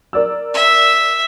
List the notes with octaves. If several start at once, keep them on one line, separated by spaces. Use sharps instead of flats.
A#4 D5 E6
E5